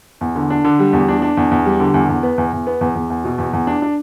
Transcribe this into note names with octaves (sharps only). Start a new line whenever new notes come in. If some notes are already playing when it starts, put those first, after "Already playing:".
E2
D3
D4
D3
G3
E2
D4
D4
E2
E2
G3
D3
E2
E2
B3
E2
E2
B3
E2
E2
E2
B2
E2
E2
D4
D4